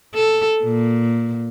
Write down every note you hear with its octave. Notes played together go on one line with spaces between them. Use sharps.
A4
A#2